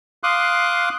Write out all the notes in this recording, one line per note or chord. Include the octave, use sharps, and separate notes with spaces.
F5 C6 D6 D#6 F#6